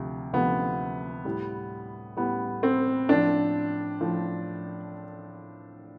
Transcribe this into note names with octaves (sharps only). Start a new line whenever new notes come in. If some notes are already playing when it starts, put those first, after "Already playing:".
Already playing: D2 C3 F3
D2 C3 F3 B3
A2 G3
A2 G3 B3
C4
A2 F3 D4
A2 F3